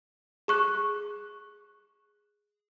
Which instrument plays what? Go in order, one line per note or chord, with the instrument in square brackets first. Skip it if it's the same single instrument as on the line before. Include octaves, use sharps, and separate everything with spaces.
[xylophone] G#4 C#6 F#6